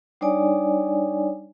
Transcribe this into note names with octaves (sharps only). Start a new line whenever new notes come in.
G3 D4 D#4 C#5 D5 G#5